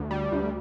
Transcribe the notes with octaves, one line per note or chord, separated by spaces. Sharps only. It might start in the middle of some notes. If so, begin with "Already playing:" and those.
Already playing: D2
G3
D2